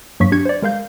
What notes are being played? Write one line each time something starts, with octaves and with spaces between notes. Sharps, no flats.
G2 F#3 A#3 C#6 B6
D4 G4 G#6 C#7
C5 D5
G#3 A#4 F5 G6